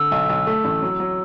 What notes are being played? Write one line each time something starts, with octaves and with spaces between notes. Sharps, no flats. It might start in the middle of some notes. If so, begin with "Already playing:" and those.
Already playing: D3 E6
B1
B1
A3
A1
F#3
F#3